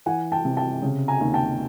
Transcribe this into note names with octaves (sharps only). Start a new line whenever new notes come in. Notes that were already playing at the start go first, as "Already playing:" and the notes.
E3 F#5 G#5
G5 A5
C3
G5 A5
C#3
G#5 A#5
D#2
G5 A5